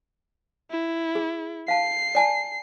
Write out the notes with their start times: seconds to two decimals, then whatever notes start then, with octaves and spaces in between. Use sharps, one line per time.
0.71 E4
1.15 G#4
1.68 F5 A5 C7
2.15 D5 G#5 A5